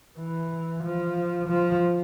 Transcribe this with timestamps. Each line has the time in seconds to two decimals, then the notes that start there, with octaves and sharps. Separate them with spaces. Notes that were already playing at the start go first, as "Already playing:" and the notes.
0.19 E3
0.83 F3
1.47 F3